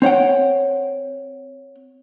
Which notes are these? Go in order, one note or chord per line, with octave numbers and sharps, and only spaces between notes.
C4 C#5 F#5 G5